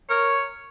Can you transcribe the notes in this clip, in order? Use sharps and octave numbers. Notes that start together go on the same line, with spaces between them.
A#4 C#5